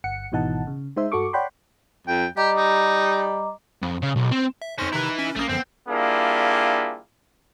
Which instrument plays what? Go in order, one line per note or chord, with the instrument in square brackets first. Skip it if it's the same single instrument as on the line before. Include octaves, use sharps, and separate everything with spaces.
[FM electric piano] G1 F#5 C#7
G#1 B2 E3 D#4 F#5 A5
C#3
G#3 D#4 C5 E5
G2 F#4 A4 C#6 D6
C#5 D5 F#5 G5 B5 C6
[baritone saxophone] F2 [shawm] G5
[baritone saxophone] G3 [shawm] G4 [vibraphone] D#5 A#5 D6
[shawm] D#4
[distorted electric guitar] F2
C#3
B1
C4
[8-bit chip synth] E5
[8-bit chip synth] F2 F6 A#6 [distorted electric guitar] C#4 C5 [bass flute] D#4
[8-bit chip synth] C3 D#3 A#5 [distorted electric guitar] E4 B4
[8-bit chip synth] C#4
[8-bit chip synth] A#1 D#6 [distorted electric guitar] A3 A#3 [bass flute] C#4
[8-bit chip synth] F#2 D3 F3 [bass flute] B3 [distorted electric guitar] C4
[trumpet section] G3 A#3 D4 E4 F4 G#4